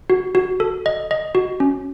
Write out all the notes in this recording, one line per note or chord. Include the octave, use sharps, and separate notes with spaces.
F#4
F#4
A4
D#5
D#5
F#4
C#4